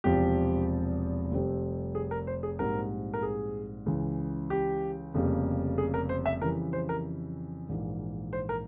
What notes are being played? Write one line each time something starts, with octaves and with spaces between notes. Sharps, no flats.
E1 E2 C3 F3 C4 G4
F1 F2 C3 G3 C4
G#4
A#4
C5
G#4
A#1 G#2 G3 C4 A#4
A#4
G#4
C#2 C#3 E3
G4
F1 F2 C#3 G3 A#3
G#4
A#4
C5
E5
F2 C#3 E3 G3 A#4
C5
A#4
A#1 G#2 E3 A#3
C5
A#4